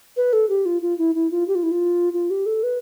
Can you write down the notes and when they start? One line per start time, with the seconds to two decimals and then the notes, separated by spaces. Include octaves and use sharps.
0.17 B4
0.33 A4
0.49 G4
0.66 F4
0.82 F4
0.98 E4
1.15 E4
1.31 F4
1.48 G4
1.55 F4
1.63 E4
1.71 F4
2.14 F4
2.30 G4
2.46 A4
2.63 B4